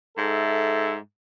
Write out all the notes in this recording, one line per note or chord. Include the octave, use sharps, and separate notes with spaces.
G#2 A4 E5